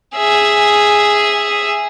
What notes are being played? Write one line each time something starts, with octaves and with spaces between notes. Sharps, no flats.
G#4 E5